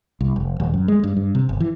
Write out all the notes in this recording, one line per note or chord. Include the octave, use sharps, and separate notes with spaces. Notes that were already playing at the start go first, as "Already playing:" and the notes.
C2
F1
D#1
F#2
G#3
G2
G2
C3
G1
E3